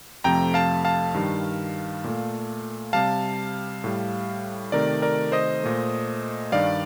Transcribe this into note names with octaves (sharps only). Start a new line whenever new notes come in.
F2 C3 F3 A3 G5 A#5
F5 A5
F5 A5
G2 D#3 G3
A#2 A3
C3 G3 F5 A5
A2 G3
C3 D#3 A3 A#4 D5
A#4 D5
C5 D#5
A#2 A3
G2 D#3 G3 D5 F5